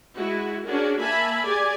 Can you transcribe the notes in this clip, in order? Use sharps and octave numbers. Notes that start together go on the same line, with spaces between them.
G#3 E4 F#4
C#4 D4 F#4 G#4 A#4
A#3 E5 G#5 A5 B5
G4 G#4 D5 G#5